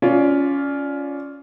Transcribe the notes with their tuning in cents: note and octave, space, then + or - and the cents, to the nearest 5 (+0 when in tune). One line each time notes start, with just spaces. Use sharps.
C#4 +15 F4 +0 D5 +0